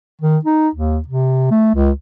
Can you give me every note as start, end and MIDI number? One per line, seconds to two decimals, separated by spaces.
0.22 0.37 51
0.45 0.69 63
0.75 0.99 39
1.08 1.47 48
1.51 1.71 57
1.75 1.90 37